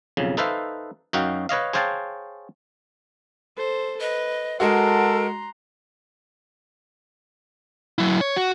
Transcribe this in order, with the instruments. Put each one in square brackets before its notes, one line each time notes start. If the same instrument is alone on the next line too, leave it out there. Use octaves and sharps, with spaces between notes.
[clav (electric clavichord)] B1 F2 C#3
D#4 A4 B4 C5 E5 F5
F#2 D#4 F#4 F5 G5
B4 C#5 D#5 F5
G#4 C5 C#5 F5 G5 A5
[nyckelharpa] A4 C5
[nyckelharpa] B4 [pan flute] D#5
[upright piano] G#3 F#4 [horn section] A4 F#5 [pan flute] A#4 [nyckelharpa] A#5 C6
[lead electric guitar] F#3 E4
C#5
F#4